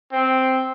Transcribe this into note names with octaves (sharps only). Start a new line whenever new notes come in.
C4